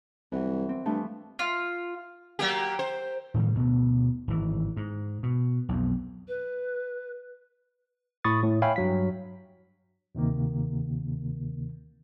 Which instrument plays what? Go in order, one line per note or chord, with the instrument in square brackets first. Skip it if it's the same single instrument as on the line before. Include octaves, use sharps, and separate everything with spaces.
[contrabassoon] C2 [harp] E3 F#3
[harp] C4
[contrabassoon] G2 [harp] E3 F3 A3
[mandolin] F4
[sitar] F#3 A#3 G4
C5
[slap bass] A2 D#3 F3 G3
D2 B2 B3
G#1 E3
G#2
B2
B1 F2
[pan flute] B4
[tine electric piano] A2 B5 C#6 D#6 A6
A2
C#5 E5 F5 G5 G#5 B5
G2 F#3 B6
[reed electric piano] D2 C3 D#3 A#3